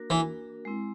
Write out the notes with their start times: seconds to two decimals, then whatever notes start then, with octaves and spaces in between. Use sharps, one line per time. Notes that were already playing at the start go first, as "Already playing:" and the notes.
Already playing: A#3 D4 F#4 A#4
0.10 E3
0.65 G#3 C4 E4